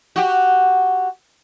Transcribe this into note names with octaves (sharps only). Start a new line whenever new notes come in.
F#4 G4